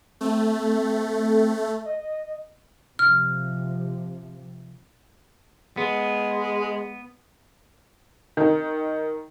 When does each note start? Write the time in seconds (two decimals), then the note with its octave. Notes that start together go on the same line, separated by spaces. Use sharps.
0.21 A3 C4
1.85 D#5
2.99 C3 F3 F6
5.77 G#3 B3
8.37 D#3